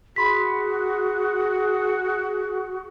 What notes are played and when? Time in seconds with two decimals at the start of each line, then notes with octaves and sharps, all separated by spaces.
0.16 F#4 G#4 B5 C6 B6